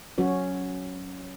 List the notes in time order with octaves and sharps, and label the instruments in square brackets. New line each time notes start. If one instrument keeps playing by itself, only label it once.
[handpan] F#3 C#4 F#4 C#5